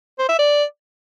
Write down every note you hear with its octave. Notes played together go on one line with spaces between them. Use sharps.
C5
E5
D5